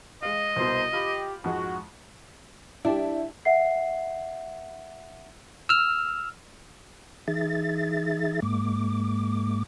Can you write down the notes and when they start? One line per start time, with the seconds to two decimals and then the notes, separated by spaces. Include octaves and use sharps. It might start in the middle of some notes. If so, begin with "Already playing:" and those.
0.23 G#3 D#5 F5
0.56 C2 B2 D#4 C5
0.93 F4 G4 F5 B5
1.44 F2 G#2 G#3 F#4
2.85 D4 E4 G4
3.45 E5 F#5 C7
5.69 E6 F6
7.28 E3 D#4 G#4 E5 A6
8.42 G#2 G#3 A#3 D6